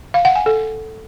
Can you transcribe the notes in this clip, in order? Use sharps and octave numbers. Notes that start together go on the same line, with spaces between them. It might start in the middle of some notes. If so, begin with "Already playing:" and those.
F5
F#5
G#5
A4